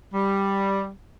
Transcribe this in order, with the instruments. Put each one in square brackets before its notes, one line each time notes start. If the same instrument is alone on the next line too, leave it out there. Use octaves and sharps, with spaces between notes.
[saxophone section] G3